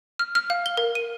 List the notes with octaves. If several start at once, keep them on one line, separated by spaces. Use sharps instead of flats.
F6
F6
F5
G7
A#4
D#7